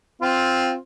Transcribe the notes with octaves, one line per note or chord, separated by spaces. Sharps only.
C4 F4